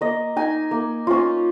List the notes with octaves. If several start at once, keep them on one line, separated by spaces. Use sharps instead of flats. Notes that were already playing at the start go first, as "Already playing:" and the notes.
A#3 D#5
D#4 G#5
A#3
C#4 F4